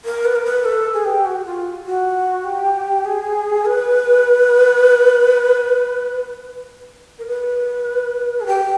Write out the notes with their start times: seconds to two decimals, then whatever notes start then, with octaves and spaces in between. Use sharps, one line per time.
0.05 A#4
0.25 B4
0.36 A#4
0.44 B4
0.65 A4
0.94 G#4
1.05 G4
1.25 F#4
1.45 F4
1.85 F#4
2.45 G4
3.05 G#4
3.65 B4
7.19 A#4
7.27 B4
8.41 G#4
8.47 G4